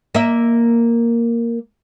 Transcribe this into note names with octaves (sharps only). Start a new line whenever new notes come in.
A#3 E5